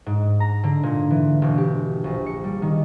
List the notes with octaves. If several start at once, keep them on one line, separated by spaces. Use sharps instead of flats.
G#2
A#5
D3
A#2
E3
E1
G4
A#1
C#7
G3
D#3